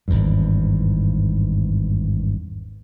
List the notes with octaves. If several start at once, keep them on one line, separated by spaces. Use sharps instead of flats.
G#1 E2 G2